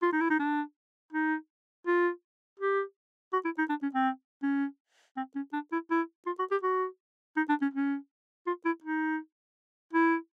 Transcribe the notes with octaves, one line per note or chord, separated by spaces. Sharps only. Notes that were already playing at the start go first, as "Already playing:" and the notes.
F4
D#4
E4
D#4
D4
D#4
F4
G4
F#4
E4
D#4
D4
C#4
C4
C#4
C4
C#4
D4
E4
E4
F4
F#4
G4
F#4
D#4
D4
C#4
C#4
F4
E4
D#4
E4